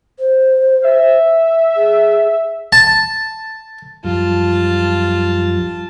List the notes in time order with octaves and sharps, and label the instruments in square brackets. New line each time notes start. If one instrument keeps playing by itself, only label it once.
[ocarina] C5
[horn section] E5
[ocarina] G#4
[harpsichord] A5
[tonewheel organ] F#2 F3 G3 [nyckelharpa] F4 A5